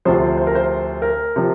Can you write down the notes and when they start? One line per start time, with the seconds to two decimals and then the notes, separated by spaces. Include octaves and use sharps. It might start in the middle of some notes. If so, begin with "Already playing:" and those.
0.05 D2 C3 F3 C5
0.37 C5
0.47 A#4
0.55 C5
1.02 A#4
1.36 C3 F3